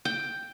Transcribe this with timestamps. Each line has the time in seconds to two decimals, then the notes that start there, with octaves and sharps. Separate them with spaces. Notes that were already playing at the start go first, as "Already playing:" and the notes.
0.05 G5